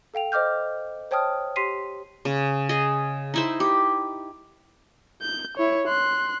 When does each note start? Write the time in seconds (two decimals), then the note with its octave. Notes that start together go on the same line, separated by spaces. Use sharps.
0.14 A4 F5 G5 F7
0.32 C5 D#5 D6 F6 G6
1.11 C5 C#5 G5 A5 D#6 F6
1.56 G4 C6 B6 C7 D#7
2.25 C#3
2.69 G#4 D#5
3.34 D#4 E4 C5
3.60 G4
5.21 G6
5.57 E4 C#5
5.88 C6 F#6